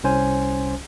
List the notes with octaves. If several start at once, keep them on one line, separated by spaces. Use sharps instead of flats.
C2 C#4 C5 G#5